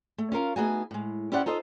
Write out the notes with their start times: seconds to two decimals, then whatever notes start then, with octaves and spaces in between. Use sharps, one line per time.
0.18 A3
0.32 C#4 F4 A#4 F5
0.56 A3 B3 D#4 F#4 G#4 G#5
0.91 A2 G#3
1.32 C#4 E4 G4 C5 D5 F#5
1.46 D#4 F4 A4 C5 D#5